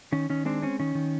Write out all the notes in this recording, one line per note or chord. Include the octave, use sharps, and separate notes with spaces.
D#3 C#4
D#3 C#4
G#3 C4 D4
C4 C#4
D#3 C#4
D#3